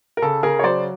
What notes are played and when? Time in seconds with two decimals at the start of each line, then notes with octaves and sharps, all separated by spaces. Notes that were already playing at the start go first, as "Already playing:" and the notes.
0.17 A#4
0.22 C#3 A4
0.43 C#3 G#4 A#4
0.59 C#5
0.64 F#3 C5 D5